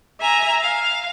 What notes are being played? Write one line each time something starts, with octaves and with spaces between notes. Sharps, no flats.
E5 G#5 A#5
F5